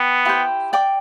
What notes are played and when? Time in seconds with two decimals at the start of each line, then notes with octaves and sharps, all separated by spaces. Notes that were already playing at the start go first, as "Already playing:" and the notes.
Already playing: B3 G5
0.25 E4 G4 C5 G5
0.73 D5 G5 D6